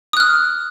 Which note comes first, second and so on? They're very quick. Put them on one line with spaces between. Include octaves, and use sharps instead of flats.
D#6 F#6 F6